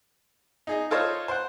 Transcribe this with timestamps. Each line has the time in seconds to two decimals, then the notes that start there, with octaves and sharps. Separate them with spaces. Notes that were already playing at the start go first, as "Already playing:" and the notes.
0.67 D#4 G#4 D#5
0.91 F4 A4 C5 C#5 D#5 F5
1.28 C5 F#5